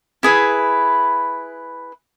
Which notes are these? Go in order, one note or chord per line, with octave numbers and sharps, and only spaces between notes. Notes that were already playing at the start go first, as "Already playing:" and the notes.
E4 G#4 B4